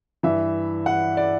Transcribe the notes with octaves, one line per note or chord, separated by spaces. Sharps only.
G2 E3 E5
F#5
D5